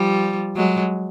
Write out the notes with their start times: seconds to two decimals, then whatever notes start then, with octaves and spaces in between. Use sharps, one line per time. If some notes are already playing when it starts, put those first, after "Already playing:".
Already playing: F3 G3
0.56 F#3 G#3